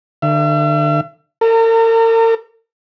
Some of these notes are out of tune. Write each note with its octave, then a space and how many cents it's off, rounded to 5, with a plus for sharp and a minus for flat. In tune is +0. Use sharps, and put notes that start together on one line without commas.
D3 +35 E5 +45
A#4 -45 A#5 -35